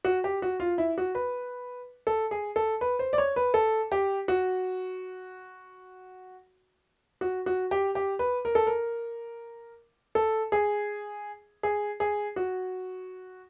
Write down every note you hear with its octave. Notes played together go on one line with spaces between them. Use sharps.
F#4
G4
F#4
F4
E4
F#4
B4
A4
G#4
A4
B4
C5
D5
C#5
B4
A4
G4
F#4
F#4
F#4
G4
G4
B4
A#4
A4
A#4
A4
G#4
G#4
G#4
F#4